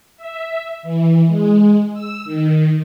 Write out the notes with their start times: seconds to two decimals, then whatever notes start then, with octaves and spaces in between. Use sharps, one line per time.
0.17 E5
0.83 E3
1.27 G#3
1.94 E6
2.25 D#3